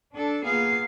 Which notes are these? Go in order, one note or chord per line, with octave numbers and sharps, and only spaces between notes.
D4 A4
A#3 B3 F4 G#4 F5